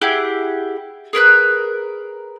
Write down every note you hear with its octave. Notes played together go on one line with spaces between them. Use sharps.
E4 G4 G#4 F#5
G#4 A#4 B4 F#6